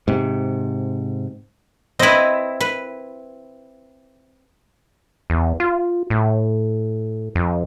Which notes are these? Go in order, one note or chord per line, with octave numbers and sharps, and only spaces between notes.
G#2 C3
C4 E4 B4 D#5
B4
E2
F4
A2
F2